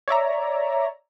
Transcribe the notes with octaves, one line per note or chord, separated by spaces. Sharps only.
C#5 D5 E5 A#5